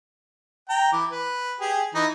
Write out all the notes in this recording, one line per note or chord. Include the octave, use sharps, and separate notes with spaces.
G5 A#5
E3 D6
B4
G4 G#4
E3 D#4